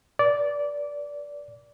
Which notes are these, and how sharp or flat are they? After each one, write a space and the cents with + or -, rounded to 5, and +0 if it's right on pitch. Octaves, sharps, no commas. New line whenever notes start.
B4 -40 D5 -15 D6 -20